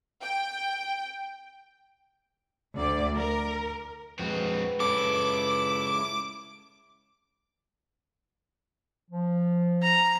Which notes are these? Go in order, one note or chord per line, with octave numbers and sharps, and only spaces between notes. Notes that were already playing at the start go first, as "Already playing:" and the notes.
G5
D2 D5
A#4
F2 G#3 C4 F#4 B4
G#3 C#4 E4 A4 D6
F3
A#5